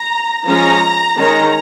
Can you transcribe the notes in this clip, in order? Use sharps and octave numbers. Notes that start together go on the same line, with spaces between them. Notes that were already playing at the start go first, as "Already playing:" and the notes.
Already playing: A#5
F3 G#3 C#4 A#5
D#3 G#3 C#4 A#5